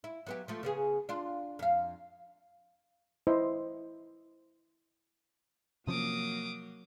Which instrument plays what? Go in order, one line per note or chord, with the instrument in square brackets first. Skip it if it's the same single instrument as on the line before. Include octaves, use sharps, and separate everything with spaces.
[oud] E4
F#3 B3 G4
F3 A3
C#3 B3 G#4
D4 F4
F2 F5
[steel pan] E4 C5 D#5
[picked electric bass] C3 F3 C#4 [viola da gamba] F#3 A#3 [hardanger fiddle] D6 D#6